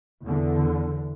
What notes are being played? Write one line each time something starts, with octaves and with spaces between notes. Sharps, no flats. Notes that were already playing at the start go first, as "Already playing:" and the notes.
E2 D3